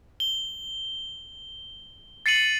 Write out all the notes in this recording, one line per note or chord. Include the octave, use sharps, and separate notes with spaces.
G7
A6 C7 C#7 D#7 F#7